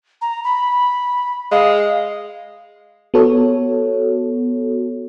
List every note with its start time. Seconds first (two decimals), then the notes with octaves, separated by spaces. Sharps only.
0.22 A#5
0.44 B5
1.52 G#3 F5
3.14 B3 F#4 A4 C#5